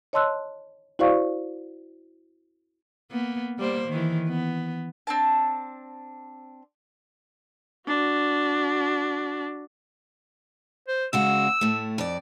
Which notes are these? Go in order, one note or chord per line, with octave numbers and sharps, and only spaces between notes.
C#5 D#5 A5 C6 E6 F#6
E4 F#4 C5 D5 F5 C#6
A#3 B3
G3 A#3 C5
D#3 E3
B3
C4 D4 A5
D4 F#4
C5
C#3 G#3 F#4 E6
A2 A3
F2 D5